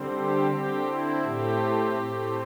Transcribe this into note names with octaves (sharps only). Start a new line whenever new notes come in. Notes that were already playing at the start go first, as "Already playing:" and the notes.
Already playing: D3 G3 C4
G4
D3 C4 G4
E4
A2 A3 C4 G4
A2 A3 C4